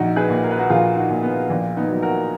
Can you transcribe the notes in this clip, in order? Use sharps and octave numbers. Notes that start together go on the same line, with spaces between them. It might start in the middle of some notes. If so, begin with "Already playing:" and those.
Already playing: A#1 D#4 F#4
G#4 B4
A#2
A#4
B4
F#4 A#4
A#1 F4 G#4
D#4 F#4
A#2
B3
A#1 A#3
B3 D#4
F#3
F#4 A#4